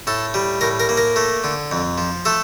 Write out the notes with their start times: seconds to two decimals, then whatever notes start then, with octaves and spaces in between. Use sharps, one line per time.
0.07 A2 A4
0.34 G3
0.61 A2 A#4
0.80 A#4
0.89 A#3
0.97 A#4
1.16 A3
1.44 D3
1.72 F2
1.98 F3
2.25 A3 A4